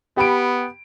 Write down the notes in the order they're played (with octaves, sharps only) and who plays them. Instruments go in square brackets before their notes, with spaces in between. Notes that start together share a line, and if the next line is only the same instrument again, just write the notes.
[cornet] B3 [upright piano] G4 B5 D7